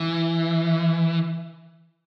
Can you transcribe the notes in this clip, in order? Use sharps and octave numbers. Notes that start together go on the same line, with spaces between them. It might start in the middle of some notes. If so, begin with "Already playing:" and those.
Already playing: E3